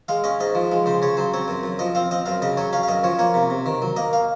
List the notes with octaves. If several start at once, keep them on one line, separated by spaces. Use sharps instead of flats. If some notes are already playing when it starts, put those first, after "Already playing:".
G#3 F5
C#4 D#5
G#2 D#5
F3
G#3
C#3 C5
C#3 C#5
F#3 C5
C4 C#5
F#2
F#2
F3 D#5
C4 F5
C4 D#5
F#2 F5
C#3 D#5
F#3 C#5
C#4 F5
F5
F#2 D#5
F3 C#5
A#3 C#5
C3
C3
D#3
F#3
A#3 D#5
F5